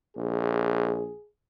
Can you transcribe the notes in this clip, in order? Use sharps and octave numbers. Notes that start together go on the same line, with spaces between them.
A#1 G#4